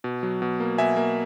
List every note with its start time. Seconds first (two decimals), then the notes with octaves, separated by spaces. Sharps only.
0.04 B2
0.23 F#3
0.42 B2
0.60 A#3
0.78 B2 E5 G#5
0.97 A#3